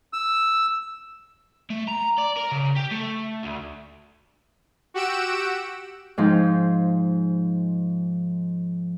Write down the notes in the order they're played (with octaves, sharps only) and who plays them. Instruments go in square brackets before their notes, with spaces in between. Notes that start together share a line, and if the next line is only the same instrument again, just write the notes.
[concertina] E6
[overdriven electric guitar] A3
A#5
D5
A#4
C#3
G4
A3
D2
[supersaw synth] F#4 G4 F#5 E6 D7 E7
[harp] G#2 F3 D#4